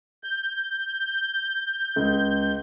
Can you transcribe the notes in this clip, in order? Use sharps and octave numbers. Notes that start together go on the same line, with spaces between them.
G6
C#2